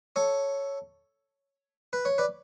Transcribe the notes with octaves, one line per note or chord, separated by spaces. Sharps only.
A4 C#5
B4
C#5
B4 D5